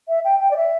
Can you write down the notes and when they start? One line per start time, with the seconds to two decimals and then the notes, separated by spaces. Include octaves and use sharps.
0.08 E5
0.25 G5
0.40 G5
0.51 D5
0.57 E5